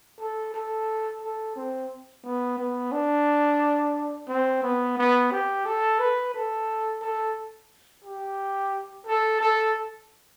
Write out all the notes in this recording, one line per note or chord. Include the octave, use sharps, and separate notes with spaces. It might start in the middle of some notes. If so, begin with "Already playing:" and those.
A4
A4
A4
C4
B3
B3
D4
C4
B3
B3
G4
A4
B4
A4
A4
G4
A4
A4